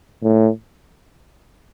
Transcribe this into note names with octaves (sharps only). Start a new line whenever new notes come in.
A2